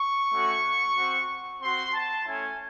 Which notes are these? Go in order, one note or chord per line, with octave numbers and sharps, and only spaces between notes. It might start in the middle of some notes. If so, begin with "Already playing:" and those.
Already playing: C#6
A3 C#4 F#4
C4 F#4
C4 F#4 C6
A5
A3 C#4 E4 G#5